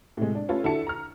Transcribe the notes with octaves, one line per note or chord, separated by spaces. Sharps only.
A2 C3 G#3
D4
A3 C#4 F4 A4 B4
D3 E4 F#4 A4 A5 C#7
A#5 F6